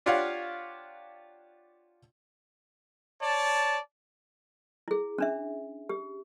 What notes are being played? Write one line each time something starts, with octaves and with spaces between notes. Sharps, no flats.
D4 F4 G4 C#5 F5 F#5
C#5 D5 A5
E4 G#4
C#4 D4 E5
G4